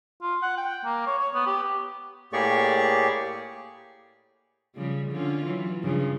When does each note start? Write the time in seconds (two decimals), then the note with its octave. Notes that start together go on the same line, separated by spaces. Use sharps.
0.22 F4
0.42 F#5
0.57 G5
0.85 A#3
1.06 C#5
1.19 C#5
1.34 B3
1.46 G4
2.33 A2 A#3 G4 G#4 D5 C#6
4.75 C#3 F3 G3
5.11 D3 C#4 F4
5.45 E3 F#3
5.83 G2 C#3 F3